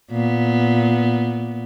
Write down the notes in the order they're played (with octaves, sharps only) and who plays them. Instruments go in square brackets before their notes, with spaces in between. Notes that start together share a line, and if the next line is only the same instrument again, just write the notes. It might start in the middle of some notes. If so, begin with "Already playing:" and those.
[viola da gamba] A#2 B3